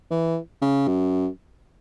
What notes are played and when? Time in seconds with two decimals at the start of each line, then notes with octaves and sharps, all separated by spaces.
0.11 E3
0.62 C#3
0.88 F#2